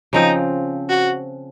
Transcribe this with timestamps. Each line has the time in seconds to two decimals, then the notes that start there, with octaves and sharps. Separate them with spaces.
0.13 C#3 F3 C4 D#4
0.90 F#4